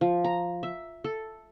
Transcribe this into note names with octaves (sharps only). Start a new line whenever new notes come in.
F3
A#5
E5
A4